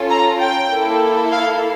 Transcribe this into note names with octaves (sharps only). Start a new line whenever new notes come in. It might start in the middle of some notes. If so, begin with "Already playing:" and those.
Already playing: C#4 F4 A4
A#5
G5
A#3 E4 A4
F5